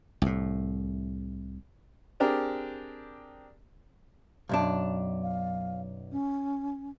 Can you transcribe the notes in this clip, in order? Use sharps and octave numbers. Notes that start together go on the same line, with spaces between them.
C2 A2
C4 D4 G4 G#4 A#4
B1 F#2 D4
F5
C#4